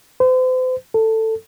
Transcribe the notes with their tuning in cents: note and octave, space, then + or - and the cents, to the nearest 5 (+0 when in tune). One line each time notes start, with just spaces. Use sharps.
C5 -40
A4 +15